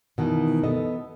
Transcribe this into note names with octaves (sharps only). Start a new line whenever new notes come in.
B2 D#3 E3
B3 A4 D#5